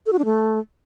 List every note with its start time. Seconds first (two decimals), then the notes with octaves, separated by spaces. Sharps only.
0.06 A4
0.13 F#4
0.19 D4
0.25 A3